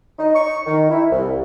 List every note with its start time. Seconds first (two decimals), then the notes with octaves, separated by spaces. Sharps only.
0.19 D#4
0.35 C#6
0.66 D#3
0.90 E4
1.11 C2